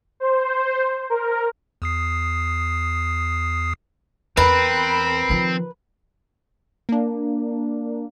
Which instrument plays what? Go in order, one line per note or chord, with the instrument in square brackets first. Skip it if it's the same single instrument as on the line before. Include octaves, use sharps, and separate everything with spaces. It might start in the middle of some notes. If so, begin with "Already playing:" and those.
[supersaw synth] C5
A#4
[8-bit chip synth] E2 D#6 C7
[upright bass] E2 [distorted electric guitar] C4 [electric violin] A#4 B5 [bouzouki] B4
[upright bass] D#3 F3
[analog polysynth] A#3 D4